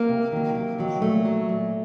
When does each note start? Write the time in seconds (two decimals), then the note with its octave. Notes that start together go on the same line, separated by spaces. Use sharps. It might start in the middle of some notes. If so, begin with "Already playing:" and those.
Already playing: A#3
0.09 C3
0.32 D#3 F#3
0.55 C3
0.78 D#3 F#3
1.02 A#2 A3
1.25 F#3
1.49 A#2